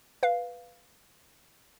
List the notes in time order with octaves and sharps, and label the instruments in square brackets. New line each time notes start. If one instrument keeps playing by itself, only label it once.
[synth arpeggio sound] B4 F5